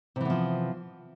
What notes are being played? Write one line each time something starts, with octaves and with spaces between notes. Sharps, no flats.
C3 E3 F3 B3